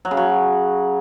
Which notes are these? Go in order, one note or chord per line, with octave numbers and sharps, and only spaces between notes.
F#3
C#3
F#3